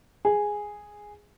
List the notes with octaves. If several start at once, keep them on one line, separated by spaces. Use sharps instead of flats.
G#4